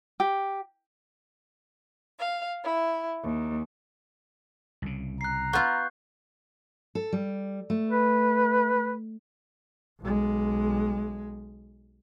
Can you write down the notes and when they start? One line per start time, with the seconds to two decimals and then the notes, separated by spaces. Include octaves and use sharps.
0.20 G4
2.18 F5
2.64 E4
3.22 D#2
4.82 C2 C#3
5.21 A#5 F#6 C7
5.53 B3 F4 C#6 F#6 G6
6.95 A4
7.13 G3
7.70 A3
7.91 B4
10.00 B1 G#3